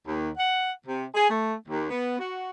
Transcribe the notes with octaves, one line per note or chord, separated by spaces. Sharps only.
D#2
F#5
C3
G#4
A3
D#2
B3
F#4